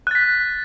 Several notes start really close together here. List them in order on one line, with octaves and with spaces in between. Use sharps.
F#6 A6 B6